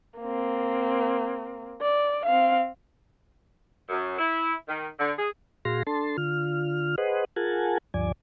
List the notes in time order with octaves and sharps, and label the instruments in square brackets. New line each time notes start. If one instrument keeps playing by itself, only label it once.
[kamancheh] A#3 C4
D5
C4 F5
[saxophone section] F#2
E4
D#3
D3
G#4
[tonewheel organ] A#2 F#4 G#4 F5 C6 A#6
D4 A4 A5 C6
D3 F4 F6
G#4 B4 C5 D#5 F#5
F4 G#4 A#4 F#5 G#5 A5
D2 G2 F3 D5 G#5